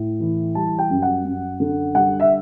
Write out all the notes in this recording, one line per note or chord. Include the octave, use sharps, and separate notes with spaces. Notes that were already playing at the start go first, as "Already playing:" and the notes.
Already playing: A2
E3
G3 A5
G5
F#2
F#5
F#2
D3
G3 F#5
E5